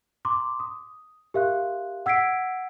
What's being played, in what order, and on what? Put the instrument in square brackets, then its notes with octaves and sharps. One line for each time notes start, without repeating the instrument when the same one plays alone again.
[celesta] A#5 C6 D6
D#6
G4 A#4 E5 F5 C6 F#6
F#5 E6 G#6 B6 C7 D7